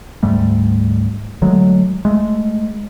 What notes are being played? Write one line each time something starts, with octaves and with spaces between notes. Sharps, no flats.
D2 G#2 G3 A3
D3 F#3 G#3 A3
G#3 A3